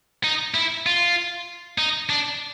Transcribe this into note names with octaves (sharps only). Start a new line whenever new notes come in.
D#4
E4
F4
D#4
D4